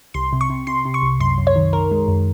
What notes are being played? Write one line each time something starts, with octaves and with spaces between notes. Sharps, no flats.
C2 C6
C3
C#6
C3
C3 C6
C3
C#6
C2
F#2 C6
F#2
C#5
D#3
D#3 A#4
G#3
F#2